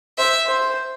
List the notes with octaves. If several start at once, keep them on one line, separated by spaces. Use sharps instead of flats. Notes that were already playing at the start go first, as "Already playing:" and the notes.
C5 E5
C5